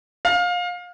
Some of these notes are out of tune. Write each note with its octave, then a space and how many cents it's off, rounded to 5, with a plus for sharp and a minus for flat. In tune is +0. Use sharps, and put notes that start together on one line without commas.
F5 +25